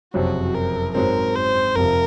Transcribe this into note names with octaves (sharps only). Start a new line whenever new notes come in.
F#1 F2 C3 F#3 F#4
A#4
G#2 F#3 C4 A#4
C5
F1 F2 C3 F3 A#4